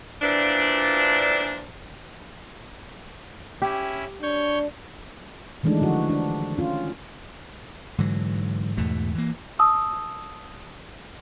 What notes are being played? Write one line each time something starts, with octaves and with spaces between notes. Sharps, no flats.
A#2 E3 F3 D4
C#4 E4 G4
D4 C#5 C#6 G6
D#3 E3 G#3 A3 D4 D#4
D3 F3 F#4
D4
C#4 F4
G#2 D3 E3 F#3
E2 G#2 B2 A3
E3 A#3
A5 D#6 E6